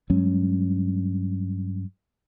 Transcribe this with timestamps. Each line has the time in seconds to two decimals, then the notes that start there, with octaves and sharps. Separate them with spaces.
0.10 G2 F#3 G#3 C#4